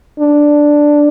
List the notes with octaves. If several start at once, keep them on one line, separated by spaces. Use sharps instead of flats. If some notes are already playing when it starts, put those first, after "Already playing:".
D4